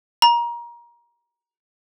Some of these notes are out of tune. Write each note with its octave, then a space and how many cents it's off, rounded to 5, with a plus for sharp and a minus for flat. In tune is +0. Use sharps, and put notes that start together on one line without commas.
A#5 +25